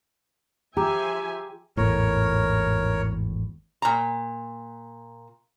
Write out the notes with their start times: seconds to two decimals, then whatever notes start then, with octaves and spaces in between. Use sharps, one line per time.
0.77 F3 G4 G#4 E5 G#5 A#5 D6
1.77 G#1 E2 A2 A#4 C#5
3.82 A#2 A#5